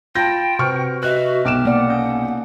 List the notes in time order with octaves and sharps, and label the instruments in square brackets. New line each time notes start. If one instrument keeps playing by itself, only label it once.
[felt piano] F4 G6 A#6 [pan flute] G5 [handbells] A5 B5 A6
[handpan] C3 [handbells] F#4 B4 C5 [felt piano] C#6 F6
[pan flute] F#4 [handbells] B4 D#5 E5 [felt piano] F#6
[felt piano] B1 D7 E7 [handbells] G5 D6 F6
[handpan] A#3 D5 [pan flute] F#5
[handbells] C#4 D#6 G6